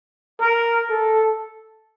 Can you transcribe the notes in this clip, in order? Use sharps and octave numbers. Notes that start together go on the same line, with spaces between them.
A#4
A4